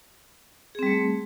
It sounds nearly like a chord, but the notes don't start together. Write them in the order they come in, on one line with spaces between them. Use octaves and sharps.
G#4 C4 G3 A3